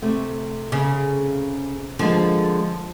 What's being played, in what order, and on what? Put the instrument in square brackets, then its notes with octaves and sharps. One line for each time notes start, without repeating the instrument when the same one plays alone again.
[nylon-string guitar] C3 A3
[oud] C#3
[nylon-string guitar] D3 G#3 A#3 [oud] F3